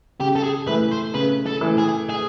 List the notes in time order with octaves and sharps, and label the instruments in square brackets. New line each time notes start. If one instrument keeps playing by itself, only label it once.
[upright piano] C#3 [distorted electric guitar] G4
[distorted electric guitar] A4
G#4
[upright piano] E3 A3 [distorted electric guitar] B4
[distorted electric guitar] C5
[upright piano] C#3 [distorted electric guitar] B4
[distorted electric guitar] A4
[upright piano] E3 A3
[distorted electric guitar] G#4
G#4